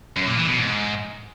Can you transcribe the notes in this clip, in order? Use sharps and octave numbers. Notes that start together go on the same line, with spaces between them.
F#2
A#2
E3
B2
G#2